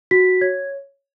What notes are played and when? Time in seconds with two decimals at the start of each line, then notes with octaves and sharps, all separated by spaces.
0.11 F#4 B6
0.41 C#5 G#6